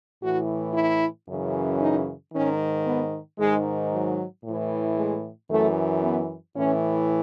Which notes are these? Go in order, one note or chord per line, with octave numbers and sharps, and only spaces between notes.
A2 E3 F#4
E4
F#2 C#3 E3
D#4
G#2 D#3 C#4
B3
G#2 D#3 G#3
F#3
A2 E3
G#3
F#2 E3 A3
B3
A2 E3 C#4